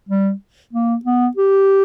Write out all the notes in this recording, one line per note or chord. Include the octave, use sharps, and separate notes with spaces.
G3
A#3
B3
G4